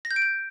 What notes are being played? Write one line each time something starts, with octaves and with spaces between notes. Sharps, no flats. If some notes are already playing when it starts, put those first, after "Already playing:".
A#6
G6
D7
G6